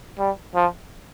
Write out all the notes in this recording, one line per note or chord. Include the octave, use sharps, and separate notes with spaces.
G3
F3